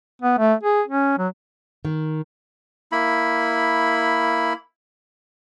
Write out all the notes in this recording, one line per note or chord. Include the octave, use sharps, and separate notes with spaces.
B3
A3
G#4
C#4
F#3
D#3
A#3 E4 B5